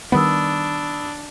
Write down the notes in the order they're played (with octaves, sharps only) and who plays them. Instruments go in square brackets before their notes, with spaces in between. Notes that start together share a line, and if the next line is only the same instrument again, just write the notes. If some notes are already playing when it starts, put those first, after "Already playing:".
[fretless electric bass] D#3 G3 B3 [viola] D4 [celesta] B5 D#6 E6